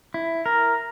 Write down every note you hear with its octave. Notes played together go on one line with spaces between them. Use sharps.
E4
A#4